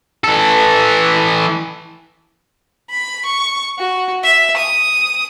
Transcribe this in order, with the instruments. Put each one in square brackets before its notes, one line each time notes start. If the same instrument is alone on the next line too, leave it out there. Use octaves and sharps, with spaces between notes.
[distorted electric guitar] E3 A4
[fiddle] B5
C#6
F#4
E5
D#6